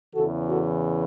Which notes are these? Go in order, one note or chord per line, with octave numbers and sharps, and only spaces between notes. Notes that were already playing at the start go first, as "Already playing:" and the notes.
E2 C#3 E3 F#4 A4
F#4 A4